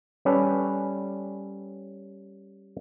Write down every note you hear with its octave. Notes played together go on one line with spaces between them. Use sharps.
G3 C#4 G4 A4 B4